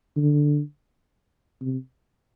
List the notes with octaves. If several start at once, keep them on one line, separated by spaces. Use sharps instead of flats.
D3
C3